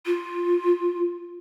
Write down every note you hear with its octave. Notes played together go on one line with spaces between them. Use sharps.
F4